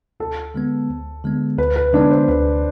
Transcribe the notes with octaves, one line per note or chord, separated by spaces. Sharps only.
D2 A4
D3 G#3 B3
D2
D3 G#3 B3
D2 B4
B4
D3 G#3 B3 D4
C5
D2 B4